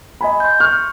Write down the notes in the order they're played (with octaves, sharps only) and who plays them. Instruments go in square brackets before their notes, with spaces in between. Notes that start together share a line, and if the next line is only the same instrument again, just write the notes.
[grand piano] D#5 G#5 B5
[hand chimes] C6 G6
[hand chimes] C#6 [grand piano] F6